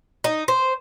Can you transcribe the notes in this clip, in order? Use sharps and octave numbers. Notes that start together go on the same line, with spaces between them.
D#4
C5